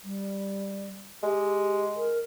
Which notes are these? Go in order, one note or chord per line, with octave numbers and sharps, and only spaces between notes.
G3
G#3 G4
A#4